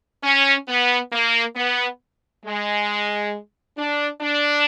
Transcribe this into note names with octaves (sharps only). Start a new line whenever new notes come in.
C#4
B3
A#3
B3
G#3
D4
D4